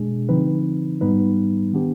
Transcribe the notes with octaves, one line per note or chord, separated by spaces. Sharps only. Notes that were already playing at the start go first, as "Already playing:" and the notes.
Already playing: B2 G#3 D4 G#4
D3 F3 C4 D#4 B4
G#2 G3 B3 D#4 B4
D#3 B3 D4 G4